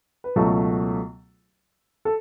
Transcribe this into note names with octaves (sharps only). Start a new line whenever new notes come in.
B4
C#2 B2 F#3 A3 A4
A4